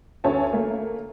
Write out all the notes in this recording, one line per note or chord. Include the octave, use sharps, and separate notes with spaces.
D2 C#4 C#5 G#5 A5
A3 A#3